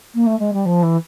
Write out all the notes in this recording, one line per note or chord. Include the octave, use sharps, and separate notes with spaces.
A#3
A3
G#3
G3
F3
E3